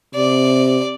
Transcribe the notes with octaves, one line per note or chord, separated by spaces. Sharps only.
C3 D5